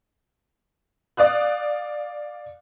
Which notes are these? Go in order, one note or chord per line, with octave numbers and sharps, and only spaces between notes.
D5 F5 D#6 F#6